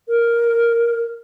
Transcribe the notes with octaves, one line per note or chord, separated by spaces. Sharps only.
A#4